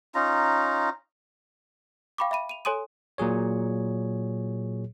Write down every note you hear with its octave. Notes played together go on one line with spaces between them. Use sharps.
C#4 D#4 F4 A#5
F5 G5 B5 C#6 D6
E5 F5 B5 D#7
D#7 F7
A4 C#5 G#5 C6 D#6 D#7
A#2 F#3 G#4 C#5